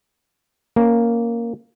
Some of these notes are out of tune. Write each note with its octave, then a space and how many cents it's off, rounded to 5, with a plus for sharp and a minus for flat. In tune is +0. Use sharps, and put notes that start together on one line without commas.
A#3 +0 C#4 +5